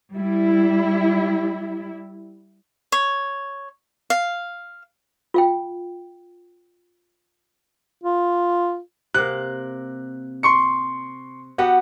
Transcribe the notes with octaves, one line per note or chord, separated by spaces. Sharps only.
G3 E4
C#5
F5
F4 F5 G5
F4
C3 A#3 F#6
C6 C#6 C#7
B3 F#4 G4 F#5